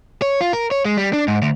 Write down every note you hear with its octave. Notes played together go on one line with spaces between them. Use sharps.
C#5
F4
A#4
C#5
G#3
G3
D4
G#2
D2